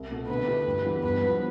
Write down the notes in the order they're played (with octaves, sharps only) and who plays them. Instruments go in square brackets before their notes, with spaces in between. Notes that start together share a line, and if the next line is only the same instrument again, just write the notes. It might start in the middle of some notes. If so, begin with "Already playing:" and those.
Already playing: [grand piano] C2
B2 A3
[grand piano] D3 [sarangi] B4
[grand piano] A3 E4 G4
G2
E3 G3 B3
[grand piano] G2 [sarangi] B4
[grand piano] F3 B3